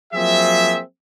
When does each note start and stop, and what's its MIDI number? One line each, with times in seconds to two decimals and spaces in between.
0.13 0.81 53
0.13 0.81 54
0.13 0.81 58
0.13 0.81 60
0.13 0.81 68
0.13 0.81 76